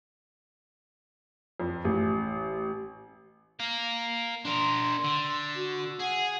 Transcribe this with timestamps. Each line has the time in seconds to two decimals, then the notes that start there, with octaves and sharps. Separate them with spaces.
1.60 F2
1.85 A1
3.59 A#4 F5
4.45 D4 A#4 C6
5.04 D3
5.56 F#4
5.99 G#4 F#5